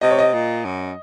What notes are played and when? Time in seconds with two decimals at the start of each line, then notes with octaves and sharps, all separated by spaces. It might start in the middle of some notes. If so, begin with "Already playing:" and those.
0.01 C3 D#5
0.11 C#5
0.19 D#5
0.34 A#2
0.65 F#2